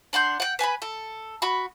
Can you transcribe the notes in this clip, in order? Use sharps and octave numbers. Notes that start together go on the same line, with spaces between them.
D4 F#5 C6 G6
F#5 G5
B4 G#5 A5 B5
A4
F#4 B5